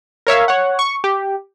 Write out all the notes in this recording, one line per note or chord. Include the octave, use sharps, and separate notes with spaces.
A#4 C#5 E5 F5
C#5 F#5
C#6
G4